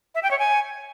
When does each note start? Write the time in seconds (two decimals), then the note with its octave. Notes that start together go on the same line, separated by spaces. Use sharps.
0.15 E5
0.23 G5
0.31 C#5
0.39 G#5